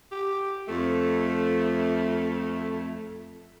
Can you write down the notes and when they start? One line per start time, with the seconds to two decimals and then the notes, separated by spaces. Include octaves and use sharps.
0.11 G4
0.68 F2 A3